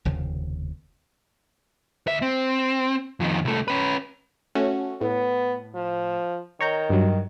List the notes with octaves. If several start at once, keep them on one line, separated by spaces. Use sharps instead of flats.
F1 D#2 C#3 F3
D2 E5
C4
F2 D#3
C2 A3
C#4 B4
A3 C#4 F#4
A2 B3
F3
D#3 C#5 A#5 G6
G2 F#3